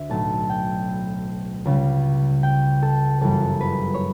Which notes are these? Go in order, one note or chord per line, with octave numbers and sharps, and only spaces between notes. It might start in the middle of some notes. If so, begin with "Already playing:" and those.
Already playing: D2 E5
B1 A2 F#3 A3 A5
G5
C#2 C#3 G3
G5
A4
G1 F#2 E3 G3 A4
B4
C#5